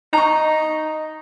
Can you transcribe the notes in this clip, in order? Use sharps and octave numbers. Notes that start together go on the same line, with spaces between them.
D#4 A#5 C#6